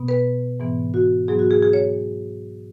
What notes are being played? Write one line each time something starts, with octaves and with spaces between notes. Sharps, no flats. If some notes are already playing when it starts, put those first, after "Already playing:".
Already playing: B2 B3
B4
G#2 E3 B3
F#4
G#2 F#3 B3 G#4
F#4
G#4
G#4
C#5